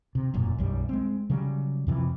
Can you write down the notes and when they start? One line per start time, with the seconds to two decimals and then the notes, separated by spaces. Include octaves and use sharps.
0.15 C3
0.34 E1 F#2 A#2
0.59 B1 F#2 G3
0.89 G#3 C4
1.30 C#3 F#3 G3
1.87 F2 C3 E3 F3